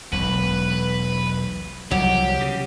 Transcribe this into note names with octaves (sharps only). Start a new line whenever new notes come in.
E1 B1 B4
C2 F3 F#3 G4
C#3